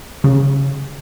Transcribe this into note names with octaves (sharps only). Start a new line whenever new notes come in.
C#3